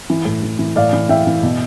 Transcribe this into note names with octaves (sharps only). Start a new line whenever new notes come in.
E3
A2
E3
E3
A2 D5 F5
E3
E3 E5 G5
E3
B2